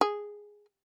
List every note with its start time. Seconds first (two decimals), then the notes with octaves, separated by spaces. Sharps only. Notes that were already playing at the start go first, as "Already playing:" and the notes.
0.01 G#4